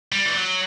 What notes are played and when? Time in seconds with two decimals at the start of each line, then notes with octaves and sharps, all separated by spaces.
0.13 G3
0.26 E3
0.35 F#3